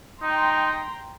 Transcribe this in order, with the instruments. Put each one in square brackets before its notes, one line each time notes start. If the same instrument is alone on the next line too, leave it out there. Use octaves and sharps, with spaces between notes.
[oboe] D#4 [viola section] G5 A#5 C6